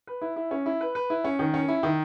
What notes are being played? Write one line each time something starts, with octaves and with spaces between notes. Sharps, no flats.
B4
E4
E4
C#4
E4
B4
B4
E4
C#4
D#3
C#4
E4
D#3